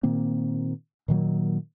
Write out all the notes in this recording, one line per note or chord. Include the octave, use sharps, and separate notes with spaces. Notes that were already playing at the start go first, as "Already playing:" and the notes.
A#2 D#3 A#3 C4
A#2 D#3 F#3 A#3